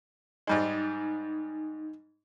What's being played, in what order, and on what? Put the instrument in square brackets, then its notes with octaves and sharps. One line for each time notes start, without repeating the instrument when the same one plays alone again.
[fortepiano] G#2 G3 G#3 [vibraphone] D#4